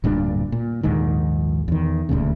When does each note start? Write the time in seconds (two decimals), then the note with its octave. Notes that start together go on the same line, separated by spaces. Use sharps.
0.04 D1 G2 A#2 D4
0.52 A#2
0.83 A#1 D#2 G#2 D#3
1.68 E2 D#3
2.09 D#1 D2 A#2 C#3